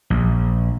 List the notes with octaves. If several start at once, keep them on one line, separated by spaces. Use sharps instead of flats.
A#1